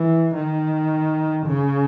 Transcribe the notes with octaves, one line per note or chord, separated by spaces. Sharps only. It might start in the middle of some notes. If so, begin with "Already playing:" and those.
Already playing: E3
D#3
C#3